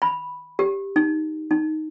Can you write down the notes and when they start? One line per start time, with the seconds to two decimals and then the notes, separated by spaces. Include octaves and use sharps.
0.02 B5
0.59 G4
0.96 D#4
1.51 D#4